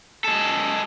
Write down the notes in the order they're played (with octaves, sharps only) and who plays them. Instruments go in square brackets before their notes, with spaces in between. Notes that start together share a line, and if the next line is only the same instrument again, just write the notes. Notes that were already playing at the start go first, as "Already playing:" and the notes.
[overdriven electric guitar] G#3 A4